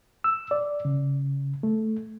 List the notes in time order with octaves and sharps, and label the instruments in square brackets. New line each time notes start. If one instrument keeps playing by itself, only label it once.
[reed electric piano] E6
D5
C#3
A3